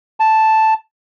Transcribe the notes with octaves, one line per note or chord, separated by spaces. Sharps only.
A5